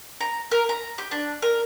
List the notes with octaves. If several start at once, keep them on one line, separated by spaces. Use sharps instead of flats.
A#5
A#4
A#5
G4
D4
A#4